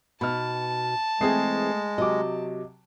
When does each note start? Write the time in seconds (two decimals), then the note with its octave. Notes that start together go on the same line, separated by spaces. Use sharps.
0.21 B2 D#4 A5 B5 F6
1.21 E3 G#3 A3 C4 G#4 D#6 C7
1.98 C3 F#3 D#5 D6